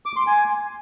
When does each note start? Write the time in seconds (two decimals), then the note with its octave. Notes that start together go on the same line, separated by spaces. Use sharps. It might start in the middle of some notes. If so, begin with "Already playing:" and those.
0.06 D6
0.16 C6
0.27 G#5